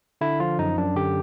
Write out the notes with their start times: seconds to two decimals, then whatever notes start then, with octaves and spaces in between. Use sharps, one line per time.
0.21 D3 E4
0.40 F3 F4
0.59 F#2 D#4
0.78 F#2 D4
0.96 D3 G4